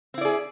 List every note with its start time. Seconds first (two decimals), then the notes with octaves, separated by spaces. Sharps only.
0.14 C4
0.18 E4
0.21 D5
0.25 G#4